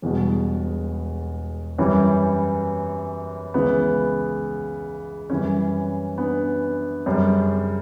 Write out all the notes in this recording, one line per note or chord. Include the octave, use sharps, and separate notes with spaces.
E1 E2 B2 G3
F#2 E3 G3 C#4
C#2 C#3 E3 B3
F#2 E3 G3 C#4
B3 D4
F#2 C#3 G3